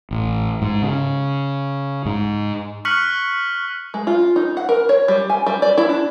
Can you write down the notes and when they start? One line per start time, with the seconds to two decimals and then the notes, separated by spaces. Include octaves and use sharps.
0.11 A1
0.62 G#2
0.82 C#3
2.06 G#2
2.85 C#6 F6 F#6 B6 C#7 F#7
3.94 G#3
4.07 F4
4.36 D#4
4.57 F#5
4.69 A#4
4.89 C#5
5.08 G3
5.30 G#5
5.47 G3
5.62 D5
5.78 E4
5.89 D4